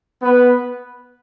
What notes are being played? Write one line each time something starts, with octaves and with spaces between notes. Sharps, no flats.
B3 B4